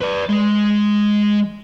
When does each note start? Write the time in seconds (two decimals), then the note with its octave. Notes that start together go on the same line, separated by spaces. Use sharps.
0.01 B4 D5
0.29 G#3